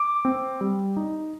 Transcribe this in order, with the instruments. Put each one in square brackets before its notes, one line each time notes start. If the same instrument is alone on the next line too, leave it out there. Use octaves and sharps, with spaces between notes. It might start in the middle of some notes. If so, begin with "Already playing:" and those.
Already playing: [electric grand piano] D6
C4
G3
D#4